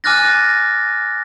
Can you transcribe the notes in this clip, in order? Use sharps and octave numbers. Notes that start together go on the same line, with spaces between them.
G#5 D6 F6 F#6 A6 A#6